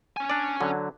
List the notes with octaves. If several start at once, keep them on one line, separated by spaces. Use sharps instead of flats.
C#4 G#5
D4 D5
D3 F#3